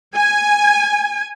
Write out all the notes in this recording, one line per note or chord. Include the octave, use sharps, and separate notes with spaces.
G#5